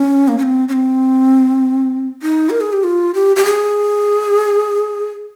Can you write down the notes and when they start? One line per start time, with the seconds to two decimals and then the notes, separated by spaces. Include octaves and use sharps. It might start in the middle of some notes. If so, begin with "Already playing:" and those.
Already playing: C#4
0.28 A#3
0.38 C#4
0.43 C4
0.68 C#4
0.73 C4
2.22 D#4
2.50 A#4
2.61 G#4
2.73 G4
2.84 F4
3.15 G4
3.36 G4
3.45 G#4